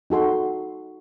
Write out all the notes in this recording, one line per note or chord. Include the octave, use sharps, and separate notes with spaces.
D#4 F#4 A4 C6